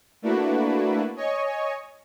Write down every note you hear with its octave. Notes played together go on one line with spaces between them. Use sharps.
A3 A#3 D4 E4 F#4 B4
C#5 D#5 G#5 C#6